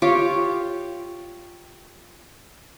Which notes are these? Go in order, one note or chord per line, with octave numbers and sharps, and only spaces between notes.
F4 G4 C#5